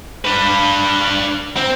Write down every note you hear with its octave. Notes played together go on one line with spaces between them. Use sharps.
D4 B4
C4